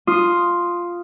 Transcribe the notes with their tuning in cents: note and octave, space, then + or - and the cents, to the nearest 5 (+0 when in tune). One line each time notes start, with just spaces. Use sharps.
F4 +0 D#6 +0